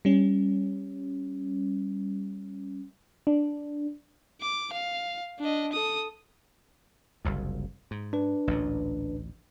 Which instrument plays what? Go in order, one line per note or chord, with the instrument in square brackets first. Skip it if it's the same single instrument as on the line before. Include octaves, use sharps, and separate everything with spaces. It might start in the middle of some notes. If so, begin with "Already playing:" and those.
[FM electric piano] G3 C#4
D4
[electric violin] D6
F5
D4 D#5
A4 D#6
[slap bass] F#1 C2 F2
G#2
[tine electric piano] D4 B4
[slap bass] A1 D2 A#2